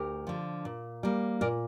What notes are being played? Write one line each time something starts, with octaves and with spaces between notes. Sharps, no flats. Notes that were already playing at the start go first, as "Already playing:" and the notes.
Already playing: D2 G4 A#4
D3 F3
A#2
G3 A#3
A#2 A#4 D5